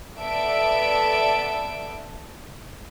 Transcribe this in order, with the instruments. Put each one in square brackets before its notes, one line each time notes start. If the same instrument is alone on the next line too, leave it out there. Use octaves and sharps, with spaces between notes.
[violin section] B3 A4 D5 E5 D7